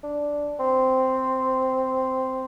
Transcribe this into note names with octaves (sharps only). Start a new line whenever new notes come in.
D4
C4